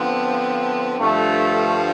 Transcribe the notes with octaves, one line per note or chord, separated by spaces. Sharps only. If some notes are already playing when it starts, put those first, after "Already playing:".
Already playing: D3 F3 B3 C4
G2 D3 F3 A3